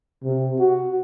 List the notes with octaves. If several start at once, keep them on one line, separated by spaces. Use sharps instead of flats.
C3
F#4